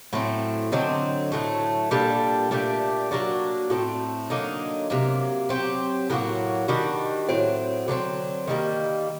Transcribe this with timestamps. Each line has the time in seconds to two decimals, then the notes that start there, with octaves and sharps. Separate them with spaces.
0.13 A2 F#3 A3 C4
0.72 D3 F#3 C4 D#4
1.32 A2 F#3 A3
1.91 A#2 G3 D4 A4
2.51 A#2 A3 D4 G4
3.11 F#3 A#3 D4 F#4
3.70 A2 A3 C4
4.30 D3 F#3 A#3 D#4
4.90 C3 F#3 A#3
5.49 F#3 C4 G4
6.10 A2 F#3 A#3 F#4
6.68 D#3 G3 D4 F#4
7.29 A2 F#3 C4
7.88 D3 F#3 A3 C4
8.47 D#3 G3 A#3